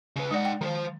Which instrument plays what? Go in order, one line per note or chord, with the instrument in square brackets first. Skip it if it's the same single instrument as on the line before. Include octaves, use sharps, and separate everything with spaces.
[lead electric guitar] C#3 B4
[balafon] G#3 D5 [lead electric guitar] D#4 F#5
[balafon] G5
[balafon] D#3 [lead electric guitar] F3 C5